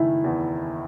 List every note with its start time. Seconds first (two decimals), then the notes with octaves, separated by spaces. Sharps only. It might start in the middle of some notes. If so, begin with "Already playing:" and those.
Already playing: F#1 D#3 A3 E4
0.24 E2